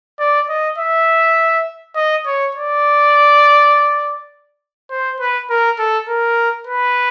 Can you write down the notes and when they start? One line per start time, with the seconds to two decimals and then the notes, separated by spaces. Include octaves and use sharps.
0.20 D5
0.49 D#5
0.78 E5
1.96 D#5
2.26 C#5
2.55 D5
4.90 C5
5.20 B4
5.50 A#4
5.79 A4
6.09 A#4
6.67 B4